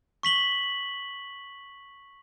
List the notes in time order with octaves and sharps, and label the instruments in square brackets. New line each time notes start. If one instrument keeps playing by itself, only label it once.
[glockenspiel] C#6 B6 F#7 G7